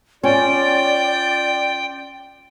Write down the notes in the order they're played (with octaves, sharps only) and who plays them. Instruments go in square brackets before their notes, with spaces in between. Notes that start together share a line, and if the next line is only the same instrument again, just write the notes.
[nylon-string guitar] C#4 [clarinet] F4 [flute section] D5 [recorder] G5